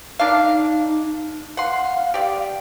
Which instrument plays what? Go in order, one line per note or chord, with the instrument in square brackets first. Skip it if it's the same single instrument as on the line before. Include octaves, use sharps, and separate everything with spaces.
[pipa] A#3 D4 F5 [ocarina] D#4
[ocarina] F5 [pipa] F#5 C6
[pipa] G4 D5